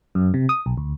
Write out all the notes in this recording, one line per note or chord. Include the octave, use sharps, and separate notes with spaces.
F#2
C3
D#6
B1
D2